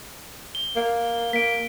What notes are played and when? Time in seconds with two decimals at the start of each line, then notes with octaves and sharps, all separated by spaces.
0.55 G7
0.76 A#3
1.33 A#3 B6 D7